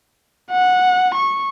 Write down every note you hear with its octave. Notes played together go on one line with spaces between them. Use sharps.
F#5
C#6